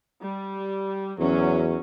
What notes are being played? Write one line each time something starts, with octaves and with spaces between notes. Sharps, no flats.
G3
E2 F#3 C#4